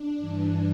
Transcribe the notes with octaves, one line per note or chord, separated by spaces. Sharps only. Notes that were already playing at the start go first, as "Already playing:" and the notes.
Already playing: D4
G2 E3